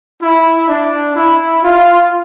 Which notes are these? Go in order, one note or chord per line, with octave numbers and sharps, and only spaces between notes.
E4
D4
E4
F4